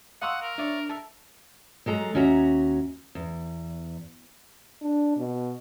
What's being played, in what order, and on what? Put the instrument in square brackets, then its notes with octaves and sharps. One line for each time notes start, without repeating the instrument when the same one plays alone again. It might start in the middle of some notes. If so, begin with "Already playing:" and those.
[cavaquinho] D#5 A#5 C#6 [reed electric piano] F5 C6 E6 [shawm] F#5
[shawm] A#4
[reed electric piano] D4 [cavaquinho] C#5 D5 E5
[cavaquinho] A4 A#4 E5
[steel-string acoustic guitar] F#3 G#3 A4 A#5
D#2 C#4 E4 F#4 E5 A#5
E2
[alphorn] D4
B2